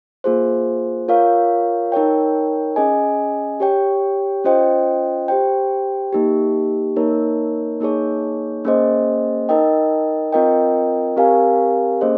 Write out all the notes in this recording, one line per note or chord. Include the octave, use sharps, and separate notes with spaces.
A#3 F4 G#4 C5
F4 A#4 C#5 F5
D#4 A#4 C#5 G5
C#4 G#4 D#5 G#5
G4 C#5 G5
C#4 F4 C5 D#5 G5
G4 C5 G5
A#3 D#4 G4
A#3 D#4 A#4 C#5
A#3 D#4 G#4 C#5
A#3 C#4 G#4 C5 D#5
D#4 A#4 D#5 G5
C4 F4 A#4 D#5 G5
C4 G4 A#4 F5 G#5
A#3 C#4 G#4 C5 D#5